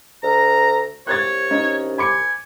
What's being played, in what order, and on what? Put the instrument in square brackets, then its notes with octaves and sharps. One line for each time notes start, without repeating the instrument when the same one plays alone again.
[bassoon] D2 [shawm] A#5
[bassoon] C2 [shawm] C#5 [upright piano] F#6 G#6 A6
[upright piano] C#4 D#4
[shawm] G#5 [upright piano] B5 D6 C#7